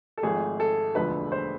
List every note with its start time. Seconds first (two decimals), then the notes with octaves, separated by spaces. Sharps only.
0.18 A4
0.23 G#1 G#2 F3 A3 G#4
0.60 A4
0.95 E1 D2 D3 F3 G#3 B4
1.32 C5